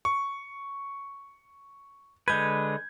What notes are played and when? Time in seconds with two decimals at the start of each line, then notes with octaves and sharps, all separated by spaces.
0.05 C#6
2.28 D3 G#3 B4 G6 G#6